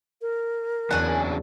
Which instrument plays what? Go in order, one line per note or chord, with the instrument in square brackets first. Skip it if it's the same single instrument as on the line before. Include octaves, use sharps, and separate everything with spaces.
[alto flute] A#4
[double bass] E2 [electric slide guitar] C#3 F#3 D4 [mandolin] F#5 G#5